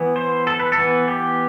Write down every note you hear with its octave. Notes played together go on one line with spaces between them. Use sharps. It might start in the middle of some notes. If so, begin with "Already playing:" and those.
Already playing: E3 B3
C5
A4
B4
A4
E3 B3
G4